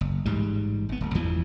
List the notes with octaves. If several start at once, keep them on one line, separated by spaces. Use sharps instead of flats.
F#1
A1 G#2 G3
G#1 B3
D1
G1 E2 E3 F3